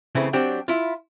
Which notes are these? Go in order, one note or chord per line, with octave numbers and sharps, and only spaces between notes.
C#3 E3 A3 C4
F#3 C4 D4 G4
E4 F4